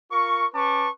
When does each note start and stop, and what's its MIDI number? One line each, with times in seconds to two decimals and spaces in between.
0.12 0.46 65
0.12 0.46 70
0.12 0.46 85
0.55 0.88 61
0.55 0.88 71
0.55 0.88 81
0.55 0.88 85
0.55 0.88 86